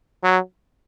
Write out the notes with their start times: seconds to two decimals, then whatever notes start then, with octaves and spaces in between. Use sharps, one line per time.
0.24 F#3